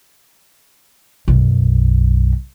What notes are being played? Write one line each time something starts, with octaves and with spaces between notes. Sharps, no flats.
B1 F#2